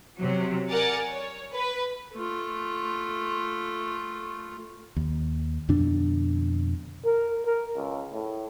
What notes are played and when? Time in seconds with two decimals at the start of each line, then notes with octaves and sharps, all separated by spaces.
0.19 C3 F#3
0.70 A#4 D5 F#5 G#5 A6
1.09 C#5
1.54 B4
2.14 A3 F4
4.96 D#2
5.69 F2 B2 D3 D4
7.05 A#4
7.45 A#4
7.76 C#2
8.13 A2